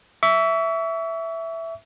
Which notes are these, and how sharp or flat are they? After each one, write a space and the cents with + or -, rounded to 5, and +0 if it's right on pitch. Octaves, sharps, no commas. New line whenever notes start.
E5 +0 C#6 +40